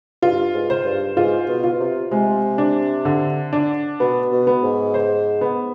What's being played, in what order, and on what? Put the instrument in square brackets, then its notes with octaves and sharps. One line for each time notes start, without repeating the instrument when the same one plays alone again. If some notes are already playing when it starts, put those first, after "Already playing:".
[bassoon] G2 [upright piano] F4
[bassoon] G#2
[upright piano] C5
[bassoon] G2
[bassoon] G#2 [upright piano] F4
[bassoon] B2
[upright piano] F4
[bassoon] C3
[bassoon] C3 [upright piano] G#3
[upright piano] D4
D3
D4
[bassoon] B2 [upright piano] B3
[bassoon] B2
[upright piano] B3
[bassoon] G#2
[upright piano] C5
B3